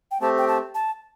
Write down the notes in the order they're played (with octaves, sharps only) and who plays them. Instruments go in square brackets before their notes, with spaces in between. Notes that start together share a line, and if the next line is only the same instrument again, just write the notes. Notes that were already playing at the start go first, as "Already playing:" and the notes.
[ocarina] G5
[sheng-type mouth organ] A3 C4 G4 [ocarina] A5
[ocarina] G5
A5
A5